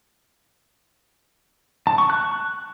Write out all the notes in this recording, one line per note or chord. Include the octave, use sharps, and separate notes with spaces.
A5
C#6
F#6